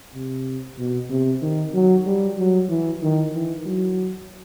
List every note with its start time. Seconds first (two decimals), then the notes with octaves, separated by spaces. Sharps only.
0.14 C3
0.79 B2
1.10 C3
1.42 D#3
1.74 F#3
2.05 G3
2.38 F#3
2.69 E3
3.02 D#3
3.34 E3
3.66 F#3